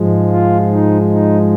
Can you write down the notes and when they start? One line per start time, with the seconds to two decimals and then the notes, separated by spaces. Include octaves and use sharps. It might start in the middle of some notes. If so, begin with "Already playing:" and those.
Already playing: G#2 F3 G#3
0.30 F4
0.70 D#4
1.10 D#4